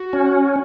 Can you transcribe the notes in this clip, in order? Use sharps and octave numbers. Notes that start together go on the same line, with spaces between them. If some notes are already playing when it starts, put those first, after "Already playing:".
Already playing: F#4
C#4